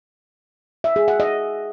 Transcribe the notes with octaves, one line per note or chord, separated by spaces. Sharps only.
E5
G#4
F#5
D#5